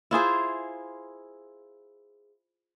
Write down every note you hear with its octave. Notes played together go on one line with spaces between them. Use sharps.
E4 F4 G#4 C5